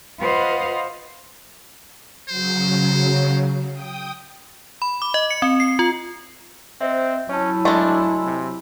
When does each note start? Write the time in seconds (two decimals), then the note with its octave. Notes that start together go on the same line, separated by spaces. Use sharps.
0.19 F4 B4 C5 D#5 F5 F#5
2.29 C#3 F#3 C5
3.72 G5 D#6
4.82 B5
5.02 D6
5.14 D#5
5.31 C#7
5.42 C4
5.60 C7
5.79 F4
6.81 C4 C5 D#5 E5
7.29 F#3 C#4 E4 C#5 A5
7.65 G#3 A3 D4 G#5 C6
8.25 C3